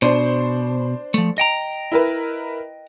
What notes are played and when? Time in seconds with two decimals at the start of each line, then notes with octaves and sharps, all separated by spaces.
0.02 B2 D4 C5
1.14 F3 A3
1.38 D#5 G5 A#5
1.92 E4 A#4 B4